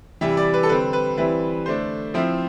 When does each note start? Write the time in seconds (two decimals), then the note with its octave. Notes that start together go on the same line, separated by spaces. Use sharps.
0.21 C3 E3 G3 E5
0.37 D5
0.54 B4
0.63 A4
0.69 D3 G3 C4 B4
0.93 B4
1.18 E3 G3 C4 E4 B4
1.66 D3 A3 D4 C5
2.14 F3 C4 E4